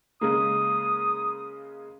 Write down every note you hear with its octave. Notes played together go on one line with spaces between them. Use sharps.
C#3 G#3 A#3 D#6